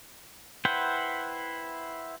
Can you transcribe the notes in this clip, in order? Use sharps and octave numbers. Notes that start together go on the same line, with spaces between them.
E4 B4 C5 F#5 G5